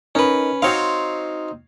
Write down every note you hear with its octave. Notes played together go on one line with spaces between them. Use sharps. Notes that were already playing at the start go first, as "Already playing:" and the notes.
C#4 D#4 A#4 B4 D#5
C4 D#4 F#4 C#5 F5 C6